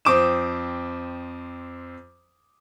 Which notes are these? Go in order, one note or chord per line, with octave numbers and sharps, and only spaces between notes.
F2 C4 C5 D6 D#6 E7